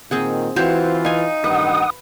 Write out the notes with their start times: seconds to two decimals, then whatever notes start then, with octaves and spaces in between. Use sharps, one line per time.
0.11 A#2 D#3 C4 G#4 F#5
0.56 E3 C4 F4 F#4 C5 C#5
1.05 D#4 F5 G#5
1.44 A1 G2 D#3 B4 F#5 D#6